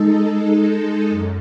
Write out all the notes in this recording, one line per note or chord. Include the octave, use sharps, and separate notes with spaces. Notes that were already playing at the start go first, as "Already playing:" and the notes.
Already playing: G#3 D#4 A4
F#2